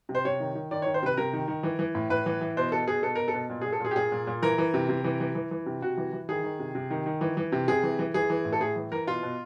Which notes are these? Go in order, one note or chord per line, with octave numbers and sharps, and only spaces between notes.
C3
C5
C3 C#5
D#3
D#3
D#3 D5
C#5
D#3
C5
C3 B4
C3 A#4
D#3
D#3
E3
E3
A2
A2 B4
E3
E3
B2 C5
B2 A4
B2 G#4
B2 A4
B2 A#4
A4
B2
A#2
G#4
A#2
A4
A#2 G#4
G4
A#2 G#4
A#2
A#2
E3 A#4
E3
C3
C3
E3
E3
E3
E3
C3
C3 F#4
E3
E3
D#3 G#4
D#3
C3
C3
D#3
D#3
E3
E3
C3
C3 G#4
E3
E3
E3 G#4
E3
A2
A4
A2 G#4
E3
E3 A#4
B2 F4
B2